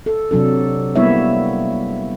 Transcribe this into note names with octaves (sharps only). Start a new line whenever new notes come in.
A4
C3 F#3 D4 A4
G3 A#3 B3 E4 C#5 E5